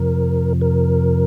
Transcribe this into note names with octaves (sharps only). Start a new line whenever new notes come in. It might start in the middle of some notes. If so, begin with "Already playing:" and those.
Already playing: F2 C3 F3 A#4
A#4